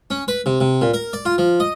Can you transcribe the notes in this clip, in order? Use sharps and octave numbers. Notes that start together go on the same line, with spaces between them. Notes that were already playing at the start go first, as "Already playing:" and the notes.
C#4
B4
C3
C3
A#2
A#4
D5
F4
F3
D#5